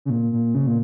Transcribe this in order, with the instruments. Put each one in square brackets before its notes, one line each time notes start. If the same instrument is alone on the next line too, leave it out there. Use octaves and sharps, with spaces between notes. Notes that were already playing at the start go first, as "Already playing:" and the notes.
[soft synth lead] C#3
A#2
A#2
C#3
A#2